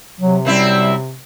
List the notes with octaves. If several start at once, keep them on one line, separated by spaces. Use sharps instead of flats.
C3 F#3
F#2 G3 C4 E4